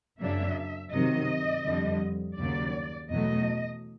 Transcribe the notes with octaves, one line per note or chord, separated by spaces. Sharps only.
F#2 C#3 F#3 A#3 D4 E5
C3 D#3 F#3 D#5
F2 D3 G3
D#2 C#3 F#3 A#3 D5
E2 B2 F#3 A3 D#5